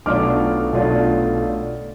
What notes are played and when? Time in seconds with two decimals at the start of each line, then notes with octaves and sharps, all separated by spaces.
0.06 B1 B2 A3 D4 F4 D6 F6
0.73 B1 B2 A3 D4 F4